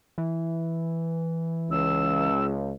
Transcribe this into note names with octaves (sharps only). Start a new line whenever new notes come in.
E3
C#2 E6